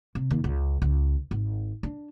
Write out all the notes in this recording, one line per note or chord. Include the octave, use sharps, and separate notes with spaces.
C3
D#2
C#2
C#2
G#1
D4